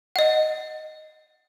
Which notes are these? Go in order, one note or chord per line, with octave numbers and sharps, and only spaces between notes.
D#5 F#5